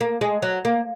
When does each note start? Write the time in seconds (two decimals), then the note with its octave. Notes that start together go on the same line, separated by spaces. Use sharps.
0.01 A#3
0.21 G#3
0.42 F#3
0.65 A#3